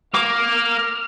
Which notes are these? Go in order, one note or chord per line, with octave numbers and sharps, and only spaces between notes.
A#3 D6 F6